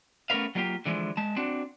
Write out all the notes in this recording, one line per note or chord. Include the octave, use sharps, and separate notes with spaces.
A3 B3 C#4 A#4 B4 F5
F#3 G3 A#3 F4 G4
D3 E3 F3 G#3
G#3 A5
C4 D4 F#4